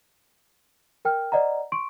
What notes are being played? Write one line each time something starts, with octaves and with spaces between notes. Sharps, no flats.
A#4 G5 F6
C5 D5 D#5 F#5 A#5
C6 C#6 D7